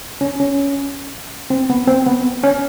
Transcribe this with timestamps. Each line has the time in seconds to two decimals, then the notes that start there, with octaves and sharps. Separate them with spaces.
0.21 C#4
0.40 C#4
1.50 C4
1.70 B3
1.87 C4
2.06 B3
2.43 C#4